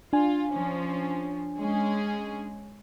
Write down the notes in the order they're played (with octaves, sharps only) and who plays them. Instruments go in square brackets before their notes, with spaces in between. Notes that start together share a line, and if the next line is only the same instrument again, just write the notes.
[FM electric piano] D4 G#5 [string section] F4
[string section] F3 C#4
G#3 C#4 G#4